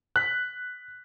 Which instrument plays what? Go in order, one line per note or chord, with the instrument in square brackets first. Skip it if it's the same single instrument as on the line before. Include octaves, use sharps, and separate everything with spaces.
[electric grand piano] F#6 B6